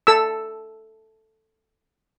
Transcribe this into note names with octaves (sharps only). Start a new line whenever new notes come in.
A4 E6